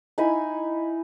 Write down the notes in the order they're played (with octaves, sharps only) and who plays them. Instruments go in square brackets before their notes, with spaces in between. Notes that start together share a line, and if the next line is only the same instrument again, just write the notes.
[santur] D#4 E4 G#5 B5